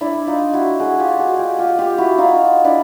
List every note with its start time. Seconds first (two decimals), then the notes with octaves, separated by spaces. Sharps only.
0.01 D4 E4
0.27 D#4 F4
0.53 E4 F#4
0.80 F#4 G#4
1.00 F4 G4
1.19 F#4 G#4
1.39 F4 G4
1.59 F4 G4
1.79 F4 G4
1.98 E4 F#4
2.18 D#4 F4
2.64 D4 E4